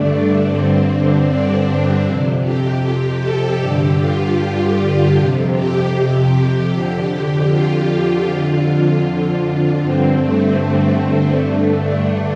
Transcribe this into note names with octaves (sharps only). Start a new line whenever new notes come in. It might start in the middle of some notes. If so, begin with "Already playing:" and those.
Already playing: G2 D3 A3 D4
G2 D3 C4
D4
F2 C3
G4
A4
G2 D3 G4
F4
G4
F2 C3
G4
G4
F2 D3
F4
F2 D3
F4
G2 D3 C4
A3
A3
G2 D3
D4